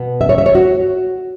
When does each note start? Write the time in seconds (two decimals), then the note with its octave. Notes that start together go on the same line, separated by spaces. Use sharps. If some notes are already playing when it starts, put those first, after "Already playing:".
Already playing: B2 B3
0.21 E5
0.29 C#5
0.38 E5
0.46 C#5
0.55 F#4